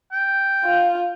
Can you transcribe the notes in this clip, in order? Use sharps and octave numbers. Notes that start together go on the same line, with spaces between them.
G5
F4